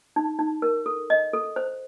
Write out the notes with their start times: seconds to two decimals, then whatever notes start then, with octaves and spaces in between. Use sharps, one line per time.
0.16 D#4
0.39 D#4
0.62 A#4
0.86 A4
1.10 D#5
1.34 A4
1.56 C5